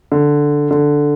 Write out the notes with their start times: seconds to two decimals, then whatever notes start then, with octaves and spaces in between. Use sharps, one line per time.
0.12 D3
0.71 D3